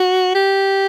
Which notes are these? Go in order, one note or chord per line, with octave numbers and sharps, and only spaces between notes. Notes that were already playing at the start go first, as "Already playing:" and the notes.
Already playing: F#4
G4